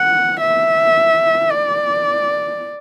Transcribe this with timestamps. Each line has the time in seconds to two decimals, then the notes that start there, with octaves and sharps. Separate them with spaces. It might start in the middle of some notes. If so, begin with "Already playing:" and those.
Already playing: F#5
0.41 E5
1.51 D5